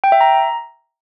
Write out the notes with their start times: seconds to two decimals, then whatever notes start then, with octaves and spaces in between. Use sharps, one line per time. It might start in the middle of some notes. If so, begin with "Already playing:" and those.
0.04 G5
0.12 E5
0.21 A#5